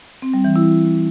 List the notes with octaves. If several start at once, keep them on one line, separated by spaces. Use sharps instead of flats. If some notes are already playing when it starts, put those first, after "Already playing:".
C4
G3
E3
E4